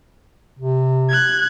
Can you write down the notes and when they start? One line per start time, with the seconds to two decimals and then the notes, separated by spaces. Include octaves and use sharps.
0.59 C3
1.10 F#6 G#6